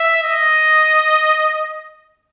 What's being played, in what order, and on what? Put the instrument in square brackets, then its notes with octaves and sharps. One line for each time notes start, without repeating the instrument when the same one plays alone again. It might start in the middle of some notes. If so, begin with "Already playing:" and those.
Already playing: [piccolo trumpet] E5
D#5